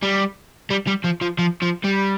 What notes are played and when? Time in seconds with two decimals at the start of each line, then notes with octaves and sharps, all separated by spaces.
0.03 G3
0.71 G3
0.88 G3
1.05 F3
1.22 F3
1.39 F3
1.62 F3
1.84 G3